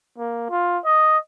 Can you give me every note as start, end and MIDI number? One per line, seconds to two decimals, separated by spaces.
0.18 0.47 58
0.50 0.79 65
0.85 1.18 75